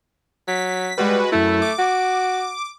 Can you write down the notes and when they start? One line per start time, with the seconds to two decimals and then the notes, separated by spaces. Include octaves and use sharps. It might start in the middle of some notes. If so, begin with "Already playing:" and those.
0.48 F#3 B6
0.98 G3 G#3 F#4 B4
1.32 F#2 A3 E4
1.62 D6
1.79 F#4